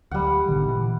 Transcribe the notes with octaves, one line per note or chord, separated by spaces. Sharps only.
D2 F#3 G3 F#5
G#1 B2 D3 D#3
A#2 E3